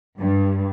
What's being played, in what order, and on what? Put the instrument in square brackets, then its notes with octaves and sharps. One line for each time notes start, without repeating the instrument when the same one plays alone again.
[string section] G2